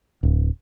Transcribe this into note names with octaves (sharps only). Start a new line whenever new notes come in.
D1